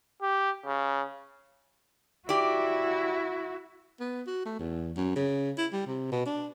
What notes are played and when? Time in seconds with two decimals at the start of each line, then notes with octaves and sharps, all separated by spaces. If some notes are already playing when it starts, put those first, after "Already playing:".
0.22 G4
0.65 C#3
2.29 E4 F#4 G4 D5
4.00 B3
4.27 F#4
4.46 A3
4.59 E2
4.97 F#2
5.16 C#3
5.58 E4
5.73 G3
5.87 C3
6.12 B2
6.26 D4